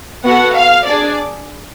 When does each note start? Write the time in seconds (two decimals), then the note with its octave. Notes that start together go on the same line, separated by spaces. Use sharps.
0.25 B3 F#4 A4 F#5
0.55 F5
0.86 D4 G#4 D5